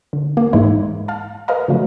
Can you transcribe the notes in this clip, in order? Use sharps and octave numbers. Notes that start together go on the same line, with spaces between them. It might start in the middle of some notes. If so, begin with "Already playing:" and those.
D3
A#3
G#2 E3 G#3 A#3 D#4 E4
F5 A5
A#4 B4 D#5 F5 A#5
C#3 F3 F#3 A3